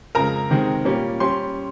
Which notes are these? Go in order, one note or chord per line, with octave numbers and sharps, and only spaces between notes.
F2 C#3 G#3 A#4 A#5
C3 D#3 G#3 C4
A#2 G3 A#3 C#4
G3 C#4 C6